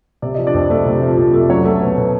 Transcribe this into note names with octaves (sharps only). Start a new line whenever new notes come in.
C3 D5
F3 D#5
D4 D5
F2
A3
C3
F3
F2
A3
D5
F#3 C#4 C#5
A3
B2
B2